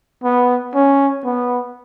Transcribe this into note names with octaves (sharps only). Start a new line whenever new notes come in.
B3
C#4
B3